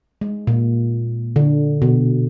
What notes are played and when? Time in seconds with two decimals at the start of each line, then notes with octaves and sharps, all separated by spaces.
0.21 G#3
0.47 A#2
1.36 D3
1.82 B2